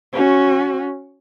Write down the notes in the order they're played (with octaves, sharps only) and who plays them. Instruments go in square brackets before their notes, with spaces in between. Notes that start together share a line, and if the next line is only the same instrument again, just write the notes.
[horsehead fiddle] C#4 F#4